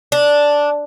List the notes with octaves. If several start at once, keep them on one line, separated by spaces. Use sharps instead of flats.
D4